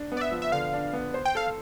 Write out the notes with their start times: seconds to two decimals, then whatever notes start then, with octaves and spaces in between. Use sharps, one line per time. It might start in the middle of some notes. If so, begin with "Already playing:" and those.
Already playing: D4
0.12 B3
0.17 D5
0.21 E5
0.31 F3
0.42 E5
0.52 D3 F5
0.73 D4
0.93 B3
1.14 C5
1.25 G5
1.35 A4 F5